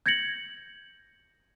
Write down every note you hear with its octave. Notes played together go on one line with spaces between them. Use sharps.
G6 G#6 A#6 C#7 F#7